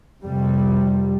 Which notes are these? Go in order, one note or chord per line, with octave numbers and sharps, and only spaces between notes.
F2 C3 G3